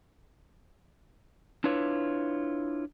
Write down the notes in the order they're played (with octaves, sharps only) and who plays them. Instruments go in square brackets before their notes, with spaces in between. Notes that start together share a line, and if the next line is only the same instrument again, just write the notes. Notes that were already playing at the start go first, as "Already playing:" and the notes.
[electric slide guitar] D4 E4 F4 B4 C#5